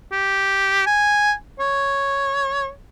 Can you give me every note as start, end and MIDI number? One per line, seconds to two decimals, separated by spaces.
0.12 0.84 67
0.86 1.33 80
1.60 2.71 73